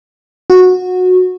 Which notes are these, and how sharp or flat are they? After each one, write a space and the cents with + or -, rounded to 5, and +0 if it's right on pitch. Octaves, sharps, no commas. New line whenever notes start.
F#4 -15